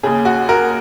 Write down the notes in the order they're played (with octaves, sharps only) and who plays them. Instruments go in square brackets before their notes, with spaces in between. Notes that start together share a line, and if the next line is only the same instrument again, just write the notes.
[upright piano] D#2 C#3 G#4
F#4
F#4 A#4